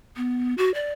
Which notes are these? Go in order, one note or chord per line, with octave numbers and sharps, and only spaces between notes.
B3
F#4
D5